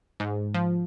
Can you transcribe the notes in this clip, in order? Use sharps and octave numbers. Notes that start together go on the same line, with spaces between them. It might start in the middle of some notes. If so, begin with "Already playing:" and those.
G#2
F3